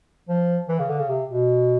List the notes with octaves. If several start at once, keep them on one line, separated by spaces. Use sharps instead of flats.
F3
E3
C#3
D3
C#3
C3
B2